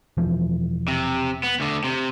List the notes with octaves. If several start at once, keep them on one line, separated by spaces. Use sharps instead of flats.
E1 E3 F3
C3
B3
D2 D3
C3